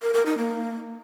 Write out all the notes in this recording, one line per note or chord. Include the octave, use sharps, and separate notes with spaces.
A#4
A#4
D#4
A#3